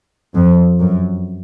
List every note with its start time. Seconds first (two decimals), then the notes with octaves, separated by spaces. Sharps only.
0.35 F2
0.80 F#2